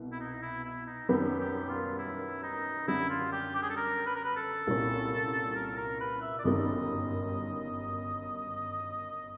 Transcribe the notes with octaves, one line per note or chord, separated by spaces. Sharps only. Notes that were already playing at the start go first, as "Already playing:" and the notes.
Already playing: C2 B2
E4
D#4
E4
E4
D#4
F#2 D#3 G3 B3 G4
G4
F4
E4
D#4
F#2 D3 G3 E4
F4
G4
G4
G#4
A4
A#4
B4
A#4
B4
A4
C2 A#2 G3 A#3 C#4
A#4
A#4
B4
E5
D5
G1 F#2 D#3 G3 D#5